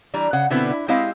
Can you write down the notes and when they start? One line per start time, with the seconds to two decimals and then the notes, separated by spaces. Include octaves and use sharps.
0.14 E3 G3 D4 A#5
0.33 C#3 F#5
0.50 B2 D3 B3 C4 E4
0.71 E4
0.88 G#3 C4 E4 G4 D#5 F5